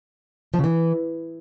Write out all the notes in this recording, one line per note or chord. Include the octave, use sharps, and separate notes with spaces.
F3
C#3
E3